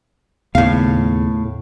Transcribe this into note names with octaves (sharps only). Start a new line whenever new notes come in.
D#2 A2 C#3 B3 F5